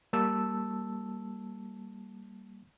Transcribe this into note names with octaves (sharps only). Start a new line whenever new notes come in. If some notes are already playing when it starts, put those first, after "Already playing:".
G3 A#3 A5 E6